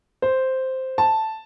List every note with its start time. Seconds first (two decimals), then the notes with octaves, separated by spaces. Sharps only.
0.22 C5
0.98 A5